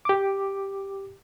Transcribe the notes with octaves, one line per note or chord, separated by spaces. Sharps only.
G4 D6